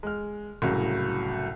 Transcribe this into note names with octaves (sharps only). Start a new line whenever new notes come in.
G#3 F6
C2 A2 C#3 F#3